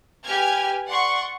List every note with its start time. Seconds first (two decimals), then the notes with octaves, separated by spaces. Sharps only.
0.23 G4 B4 G5 G#5 F6 G#6
0.86 D5 F#5 C6 C#6